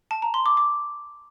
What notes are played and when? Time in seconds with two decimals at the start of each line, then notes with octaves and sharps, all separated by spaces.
0.11 A5
0.22 A#5
0.34 C6
0.46 D6
0.57 D6